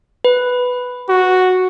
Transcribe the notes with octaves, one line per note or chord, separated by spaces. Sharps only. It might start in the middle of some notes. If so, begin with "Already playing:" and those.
B4
F#4